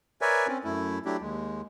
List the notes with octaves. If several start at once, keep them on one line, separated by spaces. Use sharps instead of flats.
A#4 B4 C#5 D5 E5 G#5
C4 C#4
F#2 A3 E4
F#3 A3 D4 E4 G4
D#2 G#3